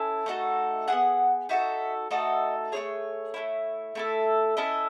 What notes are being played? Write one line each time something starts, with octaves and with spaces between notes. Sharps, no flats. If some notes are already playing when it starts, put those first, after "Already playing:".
Already playing: C#4 E4 A4 G#5
A3 D#4 F#4 A4
B3 E4 G#4 F#5
D#4 F#4 A4 E5
A3 D#4 F#4 A4 D#5
A3 D#4 G#4 C#5
A3 C#4 E4
A3 E4 A4
C#4 E4 A4 D#5